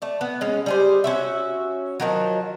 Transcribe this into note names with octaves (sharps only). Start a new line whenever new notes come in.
A3 D5
B3
G#3 C#4
G3 G#4 C5
C#4 F#4 E5
D#3 F3 F#3